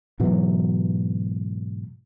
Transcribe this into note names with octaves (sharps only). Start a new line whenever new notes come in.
G#2 B2 E3 F#3